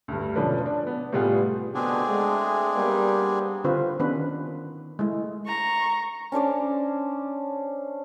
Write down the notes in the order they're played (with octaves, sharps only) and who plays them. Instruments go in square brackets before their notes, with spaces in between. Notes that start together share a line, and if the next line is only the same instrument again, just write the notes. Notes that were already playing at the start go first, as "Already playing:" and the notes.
[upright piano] D2 G2
E1 D3 F3 C#4 D4 B4
D4
B3
A2 C3 G3 B3 F4 G#4
[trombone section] B2 D3 [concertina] C4 D4 G#4
[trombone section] G#3 A3
G3 A#3 B3
[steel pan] D3 C4 F4 B4 C5
D#3 B3 C#4 D4 B4
G#3 A3 E4
[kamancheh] A#5 C#6
[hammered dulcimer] C#4 D4 C5 D5